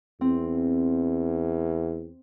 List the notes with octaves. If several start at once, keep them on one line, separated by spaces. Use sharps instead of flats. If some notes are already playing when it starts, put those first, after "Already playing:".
E2 C4